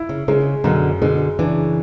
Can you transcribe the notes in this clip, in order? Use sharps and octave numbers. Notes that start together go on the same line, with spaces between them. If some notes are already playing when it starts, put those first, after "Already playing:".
Already playing: E4
C#3
C#3 G#3
F#2 B2 D3
B2 D3 G#3
C#3 E3 D4